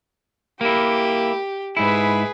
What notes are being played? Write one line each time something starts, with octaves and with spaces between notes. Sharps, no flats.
A#3 E4 G4
G#2 E4 G#4 B4